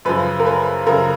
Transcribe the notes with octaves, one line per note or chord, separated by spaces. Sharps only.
F#2 C#3 F3 B4
A#4
B4
F#2 C#3 F3 A#4